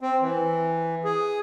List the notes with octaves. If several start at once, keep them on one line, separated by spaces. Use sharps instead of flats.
C4
E3
G#4